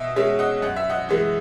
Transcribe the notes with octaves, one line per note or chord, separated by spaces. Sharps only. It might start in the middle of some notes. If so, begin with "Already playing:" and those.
Already playing: B2 D#5 E5
G#3 C#4 E5
D#5 F#5
F#2 F#5
E5
D#5 F#5
E3 G#3